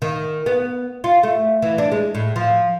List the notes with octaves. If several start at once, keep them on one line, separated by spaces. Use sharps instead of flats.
D#3
B3
F4
A3
E3
D4
G#3
A2
F3